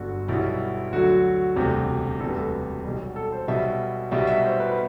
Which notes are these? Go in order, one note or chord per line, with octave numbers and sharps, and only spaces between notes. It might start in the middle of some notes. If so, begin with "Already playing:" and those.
Already playing: G1 G2 D3 F#4
B1 B2 G3 E4
D2 D3 F#3 F#4
E1 D2 C3 G3 G4
E1 D2 C3 G3 A4
B4
A4
B1 B2 G3
A4
C5
B1 B2 G3 E5
B1 B2 G3 E5
E5
C5
B4
B4